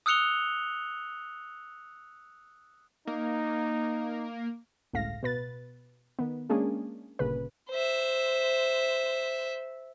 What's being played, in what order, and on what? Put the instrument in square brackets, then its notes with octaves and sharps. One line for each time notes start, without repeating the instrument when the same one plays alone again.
[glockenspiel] D#6 E6 F#6 C#7 F7 G7
[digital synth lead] A#3 [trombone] D#4
[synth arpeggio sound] G1 C#2 A2 F5 A#6
B2 B4 A6
D#3 B3
G#3 A#3 C#4 D4 G#4
G1 A#2 C#3 B4
[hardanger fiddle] C5 E5